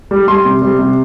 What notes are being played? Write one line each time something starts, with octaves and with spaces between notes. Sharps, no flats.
G3
G3 C6
C3
G3
C3